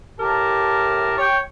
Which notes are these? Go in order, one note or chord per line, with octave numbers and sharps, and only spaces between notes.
A2 G4 A#4 A5
C#5 G5